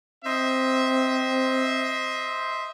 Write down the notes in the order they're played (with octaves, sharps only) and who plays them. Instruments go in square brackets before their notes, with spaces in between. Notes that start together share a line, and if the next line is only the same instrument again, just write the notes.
[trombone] C4 [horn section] C5 D#5 E5